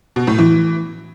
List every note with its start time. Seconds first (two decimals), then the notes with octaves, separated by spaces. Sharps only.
0.16 B2
0.27 A2
0.38 E3